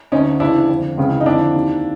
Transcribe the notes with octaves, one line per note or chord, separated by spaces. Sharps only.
D2 D3 C#4 D#4
D2 C#3 E3 D4 E4
F2 D3
C#2 C#3 E3
D#4
F2 D3 D4 E4
D#2 D#3